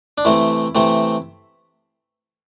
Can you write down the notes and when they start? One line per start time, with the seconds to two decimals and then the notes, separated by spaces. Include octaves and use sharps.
0.18 D4
0.25 C3 E3 A3 C4 E4
0.75 C3 E3 A3 C4